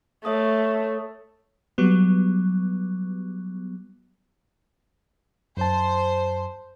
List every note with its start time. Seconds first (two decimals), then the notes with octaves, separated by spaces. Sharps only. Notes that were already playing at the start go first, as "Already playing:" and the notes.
0.25 A3 C#5 E5 D#6
1.78 F#3 G3 B3
5.57 F#2 C5 A5